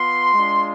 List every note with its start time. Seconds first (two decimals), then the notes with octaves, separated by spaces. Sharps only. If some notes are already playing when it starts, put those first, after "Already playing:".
Already playing: B3 F4 C6
0.33 G#3 D4 F4